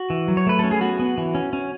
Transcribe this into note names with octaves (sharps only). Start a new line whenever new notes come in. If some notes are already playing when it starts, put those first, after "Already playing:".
Already playing: F#4
E3
F#3
C#5
A3 B4
C#4 A4
G#4
B3 F#4
B3
E3
C#4
C#4